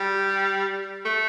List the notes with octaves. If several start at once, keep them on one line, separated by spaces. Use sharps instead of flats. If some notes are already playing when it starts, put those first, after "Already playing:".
Already playing: G3
A3